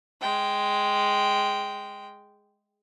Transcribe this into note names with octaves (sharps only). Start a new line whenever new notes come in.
G#3 G5